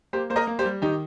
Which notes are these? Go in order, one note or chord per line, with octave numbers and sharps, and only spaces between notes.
A#3 G4 C5
A#3 C5
A#4 D#5
A#3
G4 C5
G3
D#3 D#4 G4